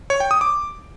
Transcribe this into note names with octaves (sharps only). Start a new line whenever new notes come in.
C#5
G5
D#6
D6